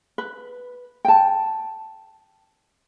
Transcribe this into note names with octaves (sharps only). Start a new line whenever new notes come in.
B4
G5 A5